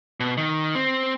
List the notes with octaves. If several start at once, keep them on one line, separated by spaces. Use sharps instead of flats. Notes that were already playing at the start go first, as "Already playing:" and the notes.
B2
D#3
C4